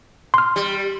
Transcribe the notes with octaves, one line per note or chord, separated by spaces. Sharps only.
C6 F6
G3